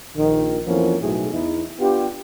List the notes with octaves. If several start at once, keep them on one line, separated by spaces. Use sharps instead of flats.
A#1 D#3
F2 E3 F3 A#3 B3 C#4
B1 A2 G#4
E2 D#4 E4
B3 D4 F4 G4